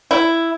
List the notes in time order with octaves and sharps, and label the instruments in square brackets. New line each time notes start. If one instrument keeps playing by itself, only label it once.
[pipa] E4